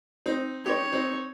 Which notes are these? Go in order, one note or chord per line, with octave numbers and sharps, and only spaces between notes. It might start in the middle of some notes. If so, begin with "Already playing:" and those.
C4 D#4
D#4 G4 C#5
C4 D#4